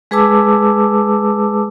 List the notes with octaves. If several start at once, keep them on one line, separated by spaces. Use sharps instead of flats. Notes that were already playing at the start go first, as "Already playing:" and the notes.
G#3 G#4 B4 A5 D6 E6